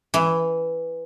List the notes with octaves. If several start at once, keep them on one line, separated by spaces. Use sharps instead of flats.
E3